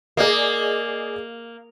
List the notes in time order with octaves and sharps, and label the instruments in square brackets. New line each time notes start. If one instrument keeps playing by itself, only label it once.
[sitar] A#3 [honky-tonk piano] G#4 D5 D#5